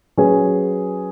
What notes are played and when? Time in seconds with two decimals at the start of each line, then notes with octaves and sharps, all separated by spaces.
0.17 F#3 C#4 G#4 B4